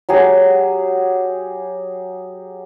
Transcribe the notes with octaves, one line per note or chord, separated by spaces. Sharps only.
F#3 G4 G#4